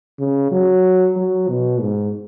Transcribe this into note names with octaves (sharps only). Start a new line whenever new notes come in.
C#3
F#3
F#3
B2
G#2